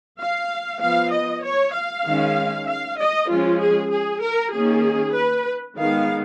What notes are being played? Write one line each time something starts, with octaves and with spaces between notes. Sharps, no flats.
F5
F3 B3 F5
D#5
C#5
F5
D#3 G#3 C#4
F5
D#5
F3 G#3 C#4 F4
G#4
G#4
A#4
D#3 A#3 C#4 G#4
B4
D#3 G#3 B3 F5